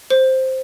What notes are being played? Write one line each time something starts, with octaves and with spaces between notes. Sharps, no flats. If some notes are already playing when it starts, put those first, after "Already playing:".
C5